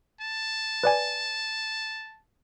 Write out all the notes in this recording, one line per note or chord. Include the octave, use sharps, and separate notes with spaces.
A5
B4 D5 G#5